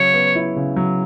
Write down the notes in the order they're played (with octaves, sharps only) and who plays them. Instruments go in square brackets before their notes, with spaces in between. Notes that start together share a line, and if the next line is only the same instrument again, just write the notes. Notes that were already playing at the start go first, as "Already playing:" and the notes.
Already playing: [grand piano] C#3 F#3 [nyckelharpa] C#5
[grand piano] B3
E4
C#3
F#3